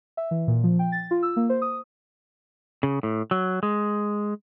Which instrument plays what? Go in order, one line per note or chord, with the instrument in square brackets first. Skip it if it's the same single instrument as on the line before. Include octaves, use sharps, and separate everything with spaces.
[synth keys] E5
E3
A#2
F3
G5
A6
F4
E6
A#3
C5
D#6
[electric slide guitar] C#3
A2
F#3
G#3